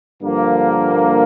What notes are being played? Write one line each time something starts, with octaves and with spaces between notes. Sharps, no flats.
G2 D3 F3 A#3